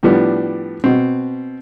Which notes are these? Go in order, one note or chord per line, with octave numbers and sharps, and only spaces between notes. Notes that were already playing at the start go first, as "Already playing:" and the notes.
A2 F3 G3 B3 D4
B2 C4